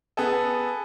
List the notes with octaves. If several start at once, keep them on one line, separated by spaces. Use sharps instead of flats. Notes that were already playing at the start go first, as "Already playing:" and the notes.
B3 G#4 A4